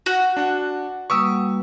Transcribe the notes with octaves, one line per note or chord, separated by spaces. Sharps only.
F#4
D4 F#5
G3 A#3 B4 C#6 D#6 E6